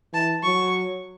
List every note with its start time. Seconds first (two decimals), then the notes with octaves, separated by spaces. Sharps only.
0.13 E3 A5
0.43 F#3 C#6